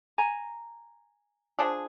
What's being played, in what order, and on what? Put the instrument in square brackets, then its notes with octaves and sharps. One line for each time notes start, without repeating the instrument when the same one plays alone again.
[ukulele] G#5 A#5
[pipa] F3 D4 G#4